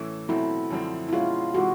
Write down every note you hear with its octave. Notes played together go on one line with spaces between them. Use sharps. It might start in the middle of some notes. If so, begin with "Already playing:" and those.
Already playing: A2 E3 A3 C#4 E4
B2 F#3 A3 C4 E4
F#2 D3 F3 A3 C4
E4
B2 G#3 C#4 F4
C3 E3 G#3 F#4